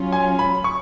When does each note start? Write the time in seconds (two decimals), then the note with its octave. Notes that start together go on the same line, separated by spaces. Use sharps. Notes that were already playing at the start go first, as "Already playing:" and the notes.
Already playing: F#3 C#4 F4
0.12 G#5
0.39 B5
0.64 C#6